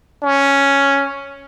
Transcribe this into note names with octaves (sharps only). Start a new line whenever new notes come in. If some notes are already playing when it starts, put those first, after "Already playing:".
C#4